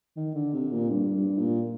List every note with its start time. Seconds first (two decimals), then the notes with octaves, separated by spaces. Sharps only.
0.16 D#3
0.35 D3
0.54 C3
0.72 A#2
0.90 G2
1.15 G2
1.39 A#2